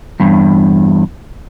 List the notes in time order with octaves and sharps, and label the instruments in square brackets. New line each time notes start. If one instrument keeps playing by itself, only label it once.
[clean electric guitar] E2 G2